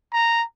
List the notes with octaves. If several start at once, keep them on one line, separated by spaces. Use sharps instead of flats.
A#5